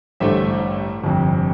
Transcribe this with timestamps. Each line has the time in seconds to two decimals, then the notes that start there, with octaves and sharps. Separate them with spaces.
0.20 A1 G2 D3 A3 C5 E5
1.04 G1 F2 C3